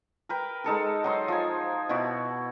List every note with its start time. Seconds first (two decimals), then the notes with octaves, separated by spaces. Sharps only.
0.29 A#4 B4 G5
0.64 G#3 D#4 A4 A#4
1.04 F#3 D#4 C5
1.28 F3 G#5
1.89 B2 E4 F#4